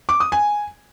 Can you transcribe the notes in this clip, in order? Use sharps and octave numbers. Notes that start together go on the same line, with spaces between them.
D6
D#6
G#5